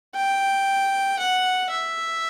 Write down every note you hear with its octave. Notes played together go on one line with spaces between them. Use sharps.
G5
F#5
E5